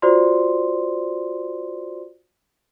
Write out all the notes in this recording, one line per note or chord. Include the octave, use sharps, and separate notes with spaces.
F4 F#4 C5 D5 C6